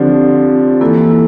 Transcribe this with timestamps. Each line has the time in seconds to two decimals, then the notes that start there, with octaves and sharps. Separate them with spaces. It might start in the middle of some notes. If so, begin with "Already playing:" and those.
Already playing: D3 F3 C4 G4 D5
0.81 E3 A#3 E4 A4